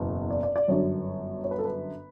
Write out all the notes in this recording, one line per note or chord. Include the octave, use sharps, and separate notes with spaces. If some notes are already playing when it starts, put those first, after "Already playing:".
Already playing: F#1 E2 B2
D5
D5
D5
G1 F#2 D3 C#5
C#5
B4
A4
B4